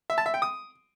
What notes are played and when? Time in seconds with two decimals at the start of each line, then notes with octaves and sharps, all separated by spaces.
0.10 E5
0.18 A5
0.26 E5
0.34 G5
0.42 D#6